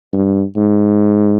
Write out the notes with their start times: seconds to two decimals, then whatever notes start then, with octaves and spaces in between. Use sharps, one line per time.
0.13 G2
0.57 G#2